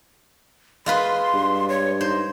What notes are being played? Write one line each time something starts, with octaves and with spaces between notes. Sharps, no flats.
G#3 F4 B4 C6
G2
C#5
D#4 C5